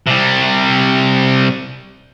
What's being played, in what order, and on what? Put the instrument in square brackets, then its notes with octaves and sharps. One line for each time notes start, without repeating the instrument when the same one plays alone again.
[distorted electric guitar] C3 G3